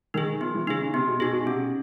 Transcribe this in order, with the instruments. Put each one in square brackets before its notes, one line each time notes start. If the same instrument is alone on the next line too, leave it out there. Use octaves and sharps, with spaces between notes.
[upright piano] D#3 [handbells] D#4
[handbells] G#4
[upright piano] F3 [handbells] B3
[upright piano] E3
[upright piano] C#3 [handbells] D#4 G#4
[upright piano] C#3
[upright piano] C3 [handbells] B3
[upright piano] B2
[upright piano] B2 [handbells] D#4 G#4
[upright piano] B2
[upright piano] C3 [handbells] C#4